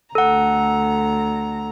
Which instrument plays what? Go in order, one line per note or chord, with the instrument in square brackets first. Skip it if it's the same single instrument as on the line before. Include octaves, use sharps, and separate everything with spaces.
[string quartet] D2 A#5 [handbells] A4 F#5